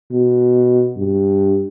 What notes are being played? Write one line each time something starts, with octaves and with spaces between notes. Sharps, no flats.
B2
G2